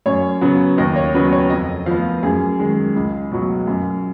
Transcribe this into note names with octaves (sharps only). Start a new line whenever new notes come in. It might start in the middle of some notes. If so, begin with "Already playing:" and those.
F#2 C#5
C#3 F#3 B3
D#2 D#5
C#5
C#3 F#3 B3 B4
C#5
F2 D#5
F3 B3 F5
F#2 G#4
D#3 G#3
C#2
B2 F#3
F#2